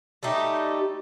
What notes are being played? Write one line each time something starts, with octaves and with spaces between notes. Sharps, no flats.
G3 A3 D#4 G4